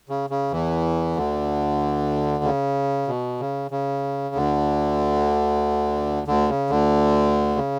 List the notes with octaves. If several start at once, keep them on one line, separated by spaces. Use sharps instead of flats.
C#3
C#3
E2 E3
D2 D3
C#3
B2
C#3
C#3
D2 D3
D2 D3
C#3
D2 D3
C#3